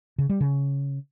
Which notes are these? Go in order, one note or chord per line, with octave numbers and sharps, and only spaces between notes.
C#3
G3
C#3